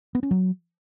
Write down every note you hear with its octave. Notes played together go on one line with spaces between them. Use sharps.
B3
C#4
F#3